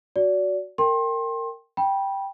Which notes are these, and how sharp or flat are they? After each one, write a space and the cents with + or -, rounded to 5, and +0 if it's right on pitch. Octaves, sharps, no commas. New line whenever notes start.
F#4 +0 D5 -30
A#4 -25 G5 +0 C6 +30
G5 +0 B5 -25